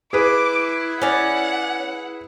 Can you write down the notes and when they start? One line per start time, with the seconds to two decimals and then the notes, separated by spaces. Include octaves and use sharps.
0.13 E4 G#4 B4 D6
1.02 C#4 D5 F#5